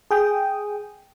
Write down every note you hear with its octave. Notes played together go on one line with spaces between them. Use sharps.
G#4 G5 D#6